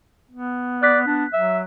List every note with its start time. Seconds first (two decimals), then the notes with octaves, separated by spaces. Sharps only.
0.31 B3
0.83 D5 F#6 B6
1.07 B3 D4
1.33 F#3 E5